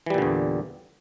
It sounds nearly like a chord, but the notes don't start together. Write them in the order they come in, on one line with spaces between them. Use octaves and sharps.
E3 G3 A#2 D3 E2